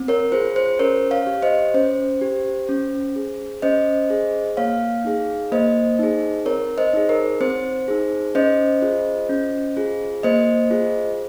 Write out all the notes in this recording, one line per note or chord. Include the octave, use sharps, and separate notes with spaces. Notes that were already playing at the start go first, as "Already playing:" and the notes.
Already playing: C4
A#4 C#5
F4 G#4 C5
C5
C#4 A#4 C#5
C#5 F5
G4
C#5
C5 D#5
C#4 C5
G4
C#4
G#4
C#4 C5 D#5
G#4
A#3 C#5 F5
D#4 G#4
A#3 C5 D#5
D#4 G#4
C4 A#4 C#5
C5 D#5
D#4 G#4
A#4 C#5
C4 C5
D#4 G#4
C#4 C5 D#5
F4 G#4
C#4
F4 G#4
A#3 C5 D#5
F4 G#4